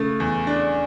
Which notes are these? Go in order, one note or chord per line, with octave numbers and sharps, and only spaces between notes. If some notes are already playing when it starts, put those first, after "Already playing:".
Already playing: C#3 A3
E2
D4